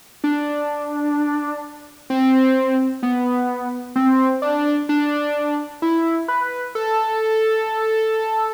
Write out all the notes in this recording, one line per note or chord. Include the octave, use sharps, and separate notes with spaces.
D4
C4
B3
C4
D4
D4
E4
B4
A4